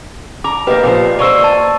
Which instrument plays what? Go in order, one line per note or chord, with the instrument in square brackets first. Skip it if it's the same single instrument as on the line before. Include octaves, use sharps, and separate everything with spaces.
[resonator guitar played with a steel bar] A#5 [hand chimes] D6
[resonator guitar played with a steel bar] A#3 G4 [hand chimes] B4 D#5
[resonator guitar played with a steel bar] A#2 F3 C5
[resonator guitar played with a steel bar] A#3 C5 [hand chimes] D5 C#6 E6
[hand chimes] A5